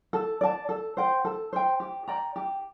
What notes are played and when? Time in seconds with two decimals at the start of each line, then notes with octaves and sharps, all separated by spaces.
0.13 A4
0.41 D5 A5
0.69 A4
0.97 C5 G5
1.25 A4
1.53 C5 G5
1.80 G4
2.08 D5 G5 A#5
2.36 G4